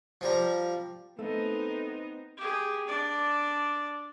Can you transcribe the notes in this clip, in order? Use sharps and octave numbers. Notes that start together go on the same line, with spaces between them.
F3 G3 A#5
A3 B3 C4 D#4
G4 G#4
D4 D5